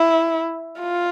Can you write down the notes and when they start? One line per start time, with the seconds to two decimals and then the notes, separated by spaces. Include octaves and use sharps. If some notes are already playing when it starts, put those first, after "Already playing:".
Already playing: E4
0.81 F4